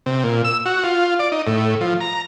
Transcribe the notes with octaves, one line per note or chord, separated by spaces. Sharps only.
C3
A#2
E6
F#4
F4
D5
D#4
A2
F3
A#5